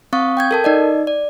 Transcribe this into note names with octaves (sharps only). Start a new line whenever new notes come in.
C4 F5 C#6 D#6
G5 G6 G#6
A4 A#4 A5
D#4 D5 D#5
D5